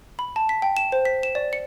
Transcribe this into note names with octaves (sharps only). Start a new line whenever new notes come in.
B5
A5
B6
G5
E7
C5
B6
E7
D5
C#7